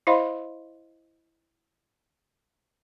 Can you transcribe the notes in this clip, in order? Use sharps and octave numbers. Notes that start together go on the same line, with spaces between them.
E4 C5 D#5 F5 B5 C6